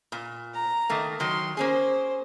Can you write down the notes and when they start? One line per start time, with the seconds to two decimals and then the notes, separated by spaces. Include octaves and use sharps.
0.12 A#2
0.54 A#5
0.90 D#3 A3 A#3
1.20 D#3 F#3 C6
1.57 A#3 C#4 G#4 C5